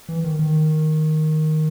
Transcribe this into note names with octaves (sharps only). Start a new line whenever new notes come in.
E3
D#3
D#3